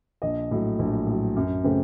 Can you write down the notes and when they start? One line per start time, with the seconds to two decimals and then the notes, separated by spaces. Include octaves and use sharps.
0.22 A#1 D#5
0.51 A2 F#3
0.79 A#1
1.07 A2 F#3
1.36 F#2
1.64 C#3 A3 C4